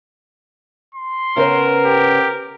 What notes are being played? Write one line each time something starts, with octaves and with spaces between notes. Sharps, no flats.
C6
C#3 B3 A#4 C5
G4